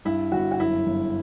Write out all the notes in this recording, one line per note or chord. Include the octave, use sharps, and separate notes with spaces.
G2 E4
G1 F#4
F#4
F#2 E4
G1